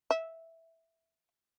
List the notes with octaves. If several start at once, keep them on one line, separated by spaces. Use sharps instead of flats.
E5